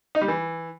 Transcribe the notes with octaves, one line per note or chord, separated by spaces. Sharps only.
D#4
G3
E3